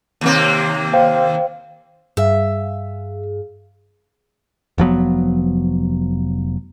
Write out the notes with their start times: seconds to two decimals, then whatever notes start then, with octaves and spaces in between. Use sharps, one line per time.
0.21 D#2 C3 A#3
0.93 C5 F5 G5
2.17 G2 G#4 E5 F5
4.78 F1 F3 F#3 B3